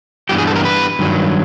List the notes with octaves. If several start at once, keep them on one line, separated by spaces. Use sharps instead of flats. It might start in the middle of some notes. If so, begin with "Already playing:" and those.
G2 E3 G3 B3 G4
G#4
A4
A#4
B4
G2 D#3 F#3